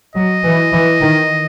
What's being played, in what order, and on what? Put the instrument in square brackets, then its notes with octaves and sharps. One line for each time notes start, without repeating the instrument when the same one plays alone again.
[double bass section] F#3 [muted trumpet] D#5
[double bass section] E3
E3
D#3